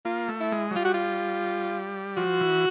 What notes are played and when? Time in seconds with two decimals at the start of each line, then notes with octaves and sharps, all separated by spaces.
0.05 A#3 F4
0.28 A3
0.40 E4
0.52 G#3
0.71 F#3
0.76 G3 F4
0.85 F#4
0.94 F4
2.17 F3 F#4
2.41 E3